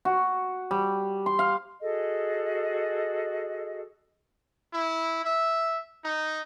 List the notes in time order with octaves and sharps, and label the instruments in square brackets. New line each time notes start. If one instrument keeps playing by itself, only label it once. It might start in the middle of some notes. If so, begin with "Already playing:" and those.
[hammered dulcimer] F#4
G3
C6
F5
[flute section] F#4 G#4 A4 D#5
[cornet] E4
E5
D#4